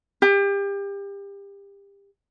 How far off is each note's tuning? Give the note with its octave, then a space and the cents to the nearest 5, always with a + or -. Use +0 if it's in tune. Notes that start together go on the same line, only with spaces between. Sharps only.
G4 +30